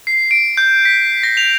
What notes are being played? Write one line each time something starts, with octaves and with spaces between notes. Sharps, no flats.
C7
D7
G6
B6
A#6
F7